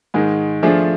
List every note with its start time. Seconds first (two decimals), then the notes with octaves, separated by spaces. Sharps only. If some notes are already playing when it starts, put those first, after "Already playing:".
0.14 G#2 D#3 G#3
0.63 F3 A3 D4 F4 G#4